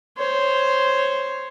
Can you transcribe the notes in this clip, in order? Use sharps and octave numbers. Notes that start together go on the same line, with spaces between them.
C5 C#5